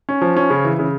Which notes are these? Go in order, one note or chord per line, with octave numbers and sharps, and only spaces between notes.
C#4
F3
C#4
C#3
E3
C#3